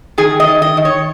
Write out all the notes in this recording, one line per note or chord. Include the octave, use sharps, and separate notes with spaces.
D#3 G#4
D#5
D#3
D#5
D#3
C#5